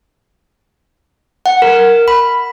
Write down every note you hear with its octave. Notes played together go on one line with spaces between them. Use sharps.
F#5
A#4
B5